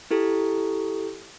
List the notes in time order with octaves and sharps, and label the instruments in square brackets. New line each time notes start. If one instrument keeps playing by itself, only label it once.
[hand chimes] E4 G4 A4